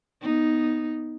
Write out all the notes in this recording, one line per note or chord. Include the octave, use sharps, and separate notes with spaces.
B3 D#4